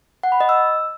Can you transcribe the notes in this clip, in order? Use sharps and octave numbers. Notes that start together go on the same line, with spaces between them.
F#5
B5
D#5
E6